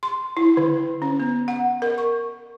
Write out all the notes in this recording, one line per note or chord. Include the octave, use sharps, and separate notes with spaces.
C6
E4
D3
C#4
B3
F#5
A#4
C#6